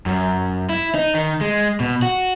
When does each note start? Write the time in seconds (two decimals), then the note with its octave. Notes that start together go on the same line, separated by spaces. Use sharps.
0.06 F#2
0.69 E4
0.95 D#4
1.15 D#3
1.41 G#3
1.80 B2
2.02 F#4